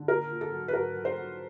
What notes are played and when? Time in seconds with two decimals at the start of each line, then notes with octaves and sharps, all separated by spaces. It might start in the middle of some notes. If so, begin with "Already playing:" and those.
Already playing: D3
0.08 A#2 A#4
0.30 A#2
0.41 A4
0.52 F#3
0.68 B4
0.73 F#3 A#4
0.95 F#3
1.05 C5
1.16 F#3